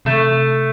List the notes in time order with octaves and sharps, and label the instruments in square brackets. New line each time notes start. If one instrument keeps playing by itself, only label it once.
[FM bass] C3 [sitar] A3